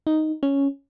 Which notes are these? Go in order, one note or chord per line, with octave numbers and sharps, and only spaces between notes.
D#4
C#4